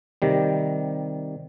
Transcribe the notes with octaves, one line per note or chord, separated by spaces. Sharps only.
C3 D#3 G3